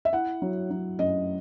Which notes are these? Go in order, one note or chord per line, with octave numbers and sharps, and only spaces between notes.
E5
E4 F#5
F#3
F#3
F#2 D#5